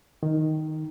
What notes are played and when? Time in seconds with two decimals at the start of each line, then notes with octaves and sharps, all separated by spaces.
0.23 D#3